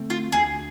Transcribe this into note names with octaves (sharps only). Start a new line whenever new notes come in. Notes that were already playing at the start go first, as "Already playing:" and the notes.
Already playing: D3 A3 C4
F4
D2 G#4